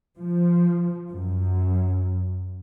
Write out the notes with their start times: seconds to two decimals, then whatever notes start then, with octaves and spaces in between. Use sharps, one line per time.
0.18 F3
1.10 F#2